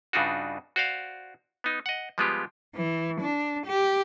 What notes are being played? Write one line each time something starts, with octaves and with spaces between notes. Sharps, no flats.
G2 C#3 D4 D#4 F4 F#4
F#4 C5 D5 F5
B3 D#4
D#5 F#5
F3 G3 G#3 B3 F4 G4
E3
D4
G4